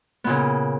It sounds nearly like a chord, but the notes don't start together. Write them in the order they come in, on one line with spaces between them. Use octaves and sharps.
B3 A#2 C#3